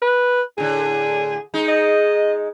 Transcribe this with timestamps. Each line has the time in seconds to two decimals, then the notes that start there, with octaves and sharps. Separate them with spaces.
0.02 B4
0.58 A2 D3 G#4
1.54 G#3 D#4
1.68 D#5